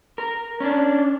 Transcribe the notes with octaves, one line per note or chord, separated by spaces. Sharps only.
A#4
C#4 D4